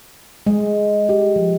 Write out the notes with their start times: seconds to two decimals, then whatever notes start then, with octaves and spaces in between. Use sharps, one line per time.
0.47 G#3
1.09 G4
1.36 F3